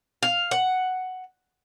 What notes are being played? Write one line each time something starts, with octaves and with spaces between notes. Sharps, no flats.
F5
F#5